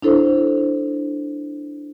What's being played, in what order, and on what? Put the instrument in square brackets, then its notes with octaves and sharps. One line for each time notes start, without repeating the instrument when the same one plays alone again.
[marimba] D4 E4 A4 C5